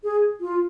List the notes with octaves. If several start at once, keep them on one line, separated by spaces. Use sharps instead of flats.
G#4
F4